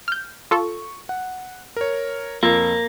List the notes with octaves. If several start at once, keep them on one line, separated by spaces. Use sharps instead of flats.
F6 G6
F4 A4 C#6
F#5
A#4 C#5
F2 A#3 F4 E6